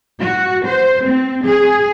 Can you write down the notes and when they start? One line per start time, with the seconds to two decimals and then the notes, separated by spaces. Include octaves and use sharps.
0.20 F#4
0.65 C5
1.04 C4
1.45 G#4